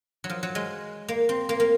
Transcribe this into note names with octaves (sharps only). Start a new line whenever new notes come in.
F#3
F3
F#3
G#3
A#3
C4
A#3
A#3